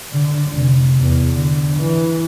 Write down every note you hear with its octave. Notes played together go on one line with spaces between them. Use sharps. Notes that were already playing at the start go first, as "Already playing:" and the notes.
D3
F1
E2
D3
E3